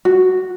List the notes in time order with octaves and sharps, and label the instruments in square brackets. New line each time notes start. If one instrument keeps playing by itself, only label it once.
[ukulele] F#4